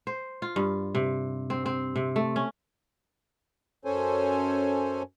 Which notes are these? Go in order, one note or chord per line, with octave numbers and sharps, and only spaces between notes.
C5
F4
G2
C3
C4
C4
C3
A3
C#4
F#2 C#4 A4 C5 C#5 G#5